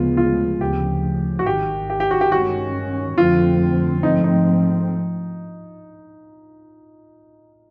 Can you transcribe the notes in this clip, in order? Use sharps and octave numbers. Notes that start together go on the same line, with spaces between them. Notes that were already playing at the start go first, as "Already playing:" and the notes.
Already playing: D2 C#3 F3 G#3 B3 F4
F4
D2 C#3 F3 G4
F#4
G#1 G#2 D#3 G4
G4
G4
F#4
G4
G2 D#3 G#3 C#4 F#4
F2 D3 F3 A3 C4 F4
G#2 F3 A3 C4 D#4
D#4